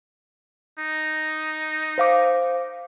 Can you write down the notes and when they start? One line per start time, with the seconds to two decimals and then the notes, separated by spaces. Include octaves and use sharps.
0.79 D#4
1.98 C5 F5 D6